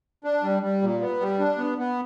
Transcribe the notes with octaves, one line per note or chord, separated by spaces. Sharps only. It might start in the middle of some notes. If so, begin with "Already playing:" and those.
D4
G3
G3
A#2
B3
G3
D4
B3
B3